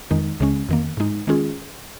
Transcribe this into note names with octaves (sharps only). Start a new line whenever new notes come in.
F2 D#3 G#3 D#4
C#2 C#3 G#3 C#4
F2 D#3 A#3
G#2 G#3 D#4
D#3 G#3 C#4 F4 G#4